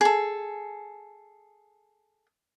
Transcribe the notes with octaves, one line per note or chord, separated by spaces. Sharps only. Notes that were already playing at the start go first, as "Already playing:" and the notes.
G#4 A4